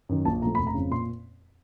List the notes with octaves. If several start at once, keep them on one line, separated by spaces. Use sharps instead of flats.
F#2 D#3
A#1 A5
A#2 F3 A3 A#5
F1 B5
A#5
F2 C#3
A#2 C6